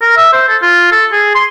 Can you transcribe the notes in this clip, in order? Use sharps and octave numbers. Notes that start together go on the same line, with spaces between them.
A#4
E5
C5
A4
F4
A4
G#4
C6